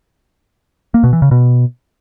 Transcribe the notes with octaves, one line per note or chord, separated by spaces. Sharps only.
A#3
B2
E3
C#3
B2